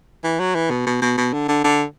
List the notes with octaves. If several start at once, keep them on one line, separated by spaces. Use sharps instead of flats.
E3
F#3
E3
B2
B2
B2
B2
D3
D3
D3